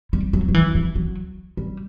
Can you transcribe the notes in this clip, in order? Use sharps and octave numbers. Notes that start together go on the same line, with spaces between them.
G3
F#3
F#3
E3
E3
F#3
G3